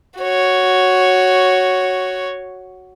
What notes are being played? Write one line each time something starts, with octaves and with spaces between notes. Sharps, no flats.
F#4 C#5